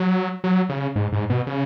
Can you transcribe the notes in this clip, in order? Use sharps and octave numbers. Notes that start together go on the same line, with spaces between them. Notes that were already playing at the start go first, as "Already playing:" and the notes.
Already playing: F#3
F#3
C#3
G#2
G#2
B2
C#3